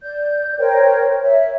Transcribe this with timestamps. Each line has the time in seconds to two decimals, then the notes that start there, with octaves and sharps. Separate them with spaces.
0.03 D5 G6
0.60 A#4 C5 C#5 G5
1.24 C#5 E5